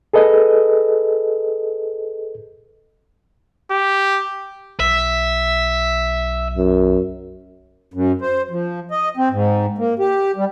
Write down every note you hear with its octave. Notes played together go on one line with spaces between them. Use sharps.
G#4 A4 B4 D#5
G4
B1 E5
F#2
F#2
C5
F3
D#5
C4
G#2
A#3
G4
G3